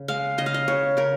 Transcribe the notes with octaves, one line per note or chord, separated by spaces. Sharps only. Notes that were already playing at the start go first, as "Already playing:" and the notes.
Already playing: C#3
G#3 F5
C#3 D#5
F5
D#5
C#3 C#5
C#3 A#4